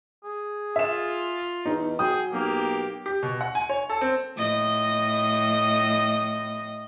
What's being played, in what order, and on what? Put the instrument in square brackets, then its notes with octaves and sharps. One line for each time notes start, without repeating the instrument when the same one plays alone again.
[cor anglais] G#4
[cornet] F4 [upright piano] E5 E7
[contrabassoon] E2 [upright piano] D#4
[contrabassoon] F#3 [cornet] G#4 [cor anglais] G5 [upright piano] D#6
[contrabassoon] B1 [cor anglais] A#3 [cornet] G4
[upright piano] G4
B2
F#5
G#5
C#5
A4
C4
[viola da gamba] A2 D#5